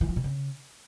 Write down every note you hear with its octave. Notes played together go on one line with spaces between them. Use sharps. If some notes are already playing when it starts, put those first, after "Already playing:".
E3
F3
B2
C#3